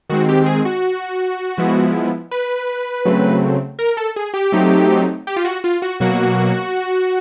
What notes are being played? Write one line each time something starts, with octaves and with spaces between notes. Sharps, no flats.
D#3 G#3 C4 F#4
G4
G#4
F#4
F3 G#3 B3 E4
B4
C#3 F#3 A3 C4
A#4
A4
G#4
G4
F#3 A3 C4 D#4
G4
F4
F#4
F4
F#4
B2 F#3 A#3 F#4